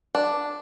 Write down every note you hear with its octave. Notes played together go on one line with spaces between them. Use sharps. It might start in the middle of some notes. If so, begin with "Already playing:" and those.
D4